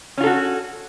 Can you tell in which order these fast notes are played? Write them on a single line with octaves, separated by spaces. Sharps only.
C#4 F4 A4 F#4